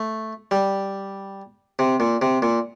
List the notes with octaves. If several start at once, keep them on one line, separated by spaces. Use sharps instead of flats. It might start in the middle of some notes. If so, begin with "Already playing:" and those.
Already playing: A3
G3
C3
A#2
C3
A#2